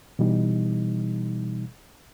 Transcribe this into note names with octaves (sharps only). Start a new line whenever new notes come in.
B2 E3 G3 D#4